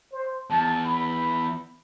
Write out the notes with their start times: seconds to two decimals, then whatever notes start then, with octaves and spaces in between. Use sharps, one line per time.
0.12 C5
0.50 E2 A5
0.84 B5